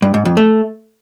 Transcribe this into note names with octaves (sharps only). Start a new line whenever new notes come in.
G2
G#2
F2
A3